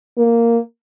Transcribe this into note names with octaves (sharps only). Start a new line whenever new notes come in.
A#3